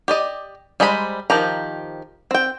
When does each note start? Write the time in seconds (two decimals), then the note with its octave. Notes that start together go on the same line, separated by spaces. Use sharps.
0.08 G4 D5 D#5
0.80 G3 G#3 C5 A#5 B5
1.30 D#3 F3 G4 A#5
2.31 C4 G5